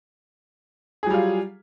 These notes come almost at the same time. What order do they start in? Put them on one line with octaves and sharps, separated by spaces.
G#4 F#3 G3 F4